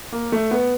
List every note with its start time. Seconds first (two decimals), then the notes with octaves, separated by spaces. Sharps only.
0.12 A#3
0.32 A3
0.51 B3